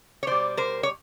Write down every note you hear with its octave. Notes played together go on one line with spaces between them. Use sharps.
C#5
B2 G3 C5 D5
A#4 C5
C#5